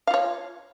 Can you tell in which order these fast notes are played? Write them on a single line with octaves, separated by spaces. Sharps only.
F5 F4 C#5